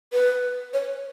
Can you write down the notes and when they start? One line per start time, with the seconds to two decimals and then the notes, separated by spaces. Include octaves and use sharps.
0.13 B4
0.73 C#5